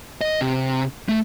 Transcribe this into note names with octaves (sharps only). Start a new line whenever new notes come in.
D#5
C3
A3